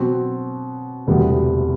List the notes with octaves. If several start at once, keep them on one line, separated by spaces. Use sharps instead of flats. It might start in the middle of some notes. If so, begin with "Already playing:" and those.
Already playing: B2 F#3 C4 F#4
E1 D2 C3 G3 B3